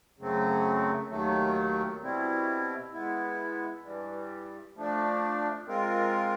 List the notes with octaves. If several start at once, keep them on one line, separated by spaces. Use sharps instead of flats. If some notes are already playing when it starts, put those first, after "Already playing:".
F#2 C#3 F#3 A3 C4
D#2 D#3 F#3 A3
B2 G3 C4 E4
G#3 B3 E4
G2 E3 G3
F3 A3 D4
G#3 C4 F4 A#4